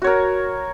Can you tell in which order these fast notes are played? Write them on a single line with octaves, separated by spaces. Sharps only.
F#4 C#5 A#4